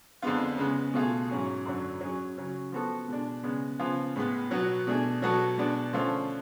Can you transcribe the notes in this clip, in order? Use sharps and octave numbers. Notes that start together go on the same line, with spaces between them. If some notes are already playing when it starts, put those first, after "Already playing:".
F2 D3 G#3 B3 F4
C#3 G#3 B3
B2 A3 F4 G#4
G#2 F#3 C#4 G#4
F#2 D3 F#3
F#3 C#4 G#4
C#3 F#3 C#4
F3 B3 F#4 A4
B2 G#3 D4
C#3 G#3 B3
C#3 F3 B3 F4 G#4
A2 G#3 B3
B2 F#3 B3 F#4
B2 A3 D4 G#4
B2 F#3 B3 F#4 A4
B2 G#3 B3 D4
D3 F3 A3 C#4 F4